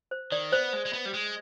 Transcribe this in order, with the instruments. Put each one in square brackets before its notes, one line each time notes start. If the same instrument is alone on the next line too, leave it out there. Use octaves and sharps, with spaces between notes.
[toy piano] C5
[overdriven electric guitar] D#3 [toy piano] D5
[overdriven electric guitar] B3 [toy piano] C5
[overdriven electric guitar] G#3
G#3
B3
G3
G#3